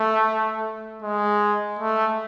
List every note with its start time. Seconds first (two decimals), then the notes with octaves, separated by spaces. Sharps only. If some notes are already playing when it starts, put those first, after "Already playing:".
Already playing: A3
1.02 G#3
1.79 A3